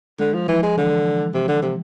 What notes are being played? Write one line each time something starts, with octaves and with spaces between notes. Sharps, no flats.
D3 G#3
F3
E3 F3
G#3
D3 E3
C3
D3
C3